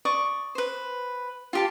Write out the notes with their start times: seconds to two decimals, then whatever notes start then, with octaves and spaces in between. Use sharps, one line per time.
0.05 D5 C#6 D#6
0.55 B4 C5
1.53 F4 G4 A5